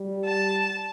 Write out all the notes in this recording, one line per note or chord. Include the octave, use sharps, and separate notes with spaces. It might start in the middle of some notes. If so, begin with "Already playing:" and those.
Already playing: G3
A5